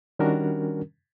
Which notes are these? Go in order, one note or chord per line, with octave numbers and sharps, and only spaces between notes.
D#3 G3 C#4 D4 F#4 A#4